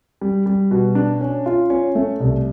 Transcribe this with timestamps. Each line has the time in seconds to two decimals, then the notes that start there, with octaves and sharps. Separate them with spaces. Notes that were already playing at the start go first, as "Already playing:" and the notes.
0.21 G3
0.46 G3
0.71 B2
0.95 D4
1.21 C#4
1.46 F4
1.70 C#4
1.95 A3
2.20 C2